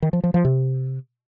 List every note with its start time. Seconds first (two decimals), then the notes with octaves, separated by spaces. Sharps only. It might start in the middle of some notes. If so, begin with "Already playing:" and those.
0.02 D#3
0.13 F3
0.24 F3
0.34 F3
0.45 C3